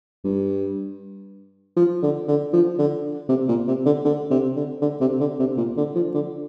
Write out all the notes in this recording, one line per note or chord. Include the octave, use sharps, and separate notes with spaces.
G2
F3
D3
D3
F3
D3
C3
A#2
C3
D3
D3
C3
D3
D3
C3
D3
C3
A#2
D3
F3
D3